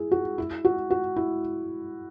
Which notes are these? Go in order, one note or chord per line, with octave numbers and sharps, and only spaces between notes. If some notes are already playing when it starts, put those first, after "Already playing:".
Already playing: E4 G#4
F#4
E4
F#4
F#4
E4